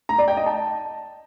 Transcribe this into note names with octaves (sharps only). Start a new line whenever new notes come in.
A#5
D5
G5
D#5
A5